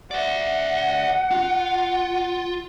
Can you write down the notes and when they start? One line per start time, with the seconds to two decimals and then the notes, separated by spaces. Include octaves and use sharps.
0.11 D5 E5 F#5
1.31 F4